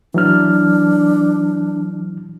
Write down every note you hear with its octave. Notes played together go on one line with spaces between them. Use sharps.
E3 F#3 D4 F6